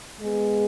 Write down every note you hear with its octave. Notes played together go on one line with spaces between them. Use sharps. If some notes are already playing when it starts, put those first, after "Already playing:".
G#3 B3 G#4